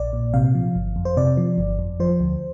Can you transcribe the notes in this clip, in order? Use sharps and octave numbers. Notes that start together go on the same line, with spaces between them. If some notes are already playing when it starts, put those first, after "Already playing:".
Already playing: A#1 D5
A#2
C3 F5
F3
G1
F2
C5
C3 D5
F3
G1
F2
F3 C5
D2